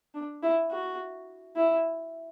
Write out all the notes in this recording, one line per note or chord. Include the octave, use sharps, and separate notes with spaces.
D4
E4
F#4
E4